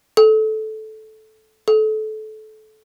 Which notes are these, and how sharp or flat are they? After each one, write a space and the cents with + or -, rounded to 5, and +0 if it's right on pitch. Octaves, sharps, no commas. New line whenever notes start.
A4 -15
A4 -25